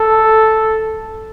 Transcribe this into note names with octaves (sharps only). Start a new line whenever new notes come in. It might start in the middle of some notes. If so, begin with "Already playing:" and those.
Already playing: A4